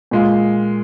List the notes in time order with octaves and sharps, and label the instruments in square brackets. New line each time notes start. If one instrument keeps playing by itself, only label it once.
[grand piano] A#2 G#3 F4